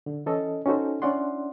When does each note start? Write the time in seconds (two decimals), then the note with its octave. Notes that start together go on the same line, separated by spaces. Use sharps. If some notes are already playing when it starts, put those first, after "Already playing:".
0.06 D3
0.26 E3 C#4 A4 D#5
0.66 C#4 D#4 F#4 A4 C5
1.02 C#4 D4 E4 D5 F#5 C6